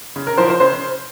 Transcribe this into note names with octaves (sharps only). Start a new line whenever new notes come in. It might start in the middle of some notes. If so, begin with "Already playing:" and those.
C#3
A#4
F3 C5
C5
C#3 C5